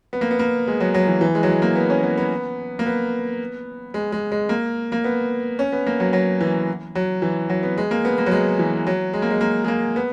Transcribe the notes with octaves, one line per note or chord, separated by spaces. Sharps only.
B3
A#3
B3
A#3
G#3
F#3
F#3
E3
E3
G#3
F#3
G#3
A#3
B3
C#4
B3
B3
A#3
B3
G#3
G#3
G#3
A#3
A#3
B3
C#4
B3
A#3
F#3
F#3
E3
F#3
E3
F#3
B3
G#3
A#3
B3
A#3
F#3
G#3
E3
F#3
G#3
A#3
G#3
A#3
G#3
A#3
B3